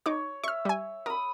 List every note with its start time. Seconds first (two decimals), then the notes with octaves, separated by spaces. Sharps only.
0.06 D#4 C#5 D6
0.44 E5 C#6 F6
0.65 G3 G#5
1.06 A#4 B5 D#6